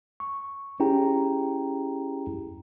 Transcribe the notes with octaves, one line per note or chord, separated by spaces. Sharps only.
C#6
C#4 E4 G4 G#4 G5 A#5